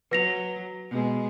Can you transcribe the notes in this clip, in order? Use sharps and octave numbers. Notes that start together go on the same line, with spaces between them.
F#3 B4 A#6 F7
B2 G#3